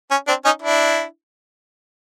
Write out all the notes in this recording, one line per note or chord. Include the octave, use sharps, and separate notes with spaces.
C#4
C4 D4
C#4 D#4
D4 E4